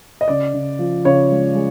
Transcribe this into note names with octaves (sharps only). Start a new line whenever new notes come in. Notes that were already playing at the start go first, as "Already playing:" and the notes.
D#5
C#3 D5
C#3
F3
C#3 C#5
G#3
G#3